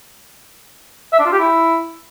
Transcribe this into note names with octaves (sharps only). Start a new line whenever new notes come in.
E5
D4
F4
G4
E4